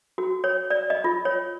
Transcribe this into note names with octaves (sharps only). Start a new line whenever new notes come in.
F#4
C#5
D5
D#5
F4
C#5